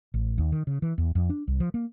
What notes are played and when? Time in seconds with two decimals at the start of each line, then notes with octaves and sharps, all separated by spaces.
0.14 A1
0.38 D#2
0.52 D#3
0.67 C#3
0.82 E3
0.98 E2
1.15 F2
1.30 D4
1.48 C2
1.60 F3
1.74 A#3